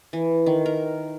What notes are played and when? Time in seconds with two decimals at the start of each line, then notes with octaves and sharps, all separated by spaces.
0.13 E3
0.46 D#3
0.66 A#4